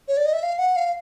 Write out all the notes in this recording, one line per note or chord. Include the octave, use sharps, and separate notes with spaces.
C#5
D5
D#5
E5
F5
F#5
F5